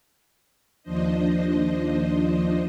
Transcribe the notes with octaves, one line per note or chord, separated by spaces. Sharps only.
D#2 F3 D4 C5 D#5